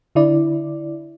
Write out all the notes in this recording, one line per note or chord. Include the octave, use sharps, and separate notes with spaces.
D3 E4 D5